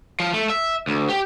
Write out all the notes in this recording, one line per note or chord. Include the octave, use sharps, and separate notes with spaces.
F3
A3
E5
D2
G4